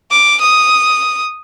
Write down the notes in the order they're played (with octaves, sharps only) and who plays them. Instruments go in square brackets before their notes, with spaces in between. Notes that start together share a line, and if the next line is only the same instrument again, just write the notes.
[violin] D6
D#6